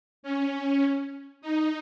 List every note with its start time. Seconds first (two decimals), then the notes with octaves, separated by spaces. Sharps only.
0.23 C#4
1.41 D#4